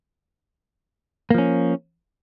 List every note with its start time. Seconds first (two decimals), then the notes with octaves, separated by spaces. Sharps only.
1.31 A#3
1.34 F3
1.38 C#4